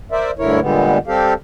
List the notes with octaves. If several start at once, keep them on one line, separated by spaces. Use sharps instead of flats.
A#4 C5 D5 E5
D2 G2 D3 E4 A#4 C#5
A#2 D3 G3 G#3 B3
G3 C4 G4 A4 F5